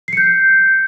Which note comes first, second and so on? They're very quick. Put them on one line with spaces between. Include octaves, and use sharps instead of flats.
C7 C#7 G6